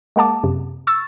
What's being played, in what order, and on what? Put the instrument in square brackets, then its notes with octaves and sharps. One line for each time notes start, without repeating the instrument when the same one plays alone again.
[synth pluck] G#3 A#3 F#5 A5 D6
F#2 C3
C#6 E6 A6